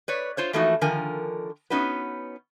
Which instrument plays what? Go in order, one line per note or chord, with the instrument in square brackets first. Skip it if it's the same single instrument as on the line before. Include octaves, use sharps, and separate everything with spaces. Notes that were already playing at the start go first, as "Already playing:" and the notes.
[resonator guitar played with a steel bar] B4 C#5 D5
F4 C5 C#5
E3 F3 A3 A#3 D#4 F#4
D3 D#3 F3 A#4 G#5
B3 C#4 D#4 F#4 B4